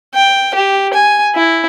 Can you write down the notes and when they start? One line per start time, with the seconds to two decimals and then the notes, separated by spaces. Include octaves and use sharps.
0.14 G5
0.54 G4
0.93 G#5
1.35 E4